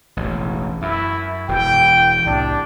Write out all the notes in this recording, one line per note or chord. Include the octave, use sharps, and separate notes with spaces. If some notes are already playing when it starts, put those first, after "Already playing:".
E1 A1
F#2 E4
E1 E3 G5
C2 A2 D4